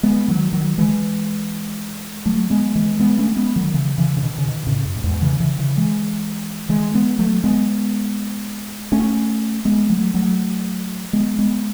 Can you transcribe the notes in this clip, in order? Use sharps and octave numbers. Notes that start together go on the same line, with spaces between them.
G#3 B3
D#3 F#3
D#3 F#3
E3 G#3
F#3 A3
G#3 B3
E3 G#3
G#3 B3
A3 C#4
G#3 B3
D#3 F#3
C#3 E3
C#3 E3
C#3
B2 D#3
C#3
B2 D#3
A2 C#3
F#2
A2
E2 G#2
C#3 E3
C#3 E3
C#3 E3
E3 G#3
E3 G#3
G#3 B3
F#3 A3
G#3 B3
A3 C#4
G#3 B3
F#3 A3
F#3 A3
G#3 B3
G#3 B3